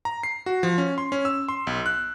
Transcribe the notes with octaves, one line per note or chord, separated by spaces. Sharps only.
A#5
C7
F#4
F3
C#4
C6
C#4
E6
C6
B1
F#6